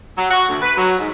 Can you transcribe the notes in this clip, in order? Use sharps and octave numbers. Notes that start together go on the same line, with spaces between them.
F#3
F#4
D2
B4
F#3
G#2